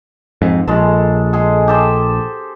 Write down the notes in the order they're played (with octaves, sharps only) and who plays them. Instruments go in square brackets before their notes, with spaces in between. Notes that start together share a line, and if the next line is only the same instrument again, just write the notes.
[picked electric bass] F2 G#2
[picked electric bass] A#1 [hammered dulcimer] G#3 A4
[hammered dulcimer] G#3 G#4 A4
G4 A4 C5